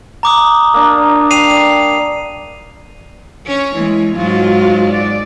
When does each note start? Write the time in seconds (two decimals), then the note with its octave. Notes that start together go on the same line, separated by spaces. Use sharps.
0.23 A#5 D6 D#6
0.74 A#3 D4
1.31 G3 C7 D#7 F7
3.46 C#4 C#5
3.76 E3 G#3
4.16 G#2 F#3 G#3 F4 F#4
4.89 D5